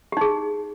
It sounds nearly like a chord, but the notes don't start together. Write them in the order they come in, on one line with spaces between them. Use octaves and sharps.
G4 D#4 G#4